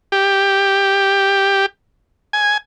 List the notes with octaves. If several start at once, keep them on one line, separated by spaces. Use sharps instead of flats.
G4
G#5